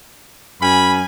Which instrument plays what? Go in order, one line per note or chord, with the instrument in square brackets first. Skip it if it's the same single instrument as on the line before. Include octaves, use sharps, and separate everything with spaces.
[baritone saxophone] F#2 [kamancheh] G#5 [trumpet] B5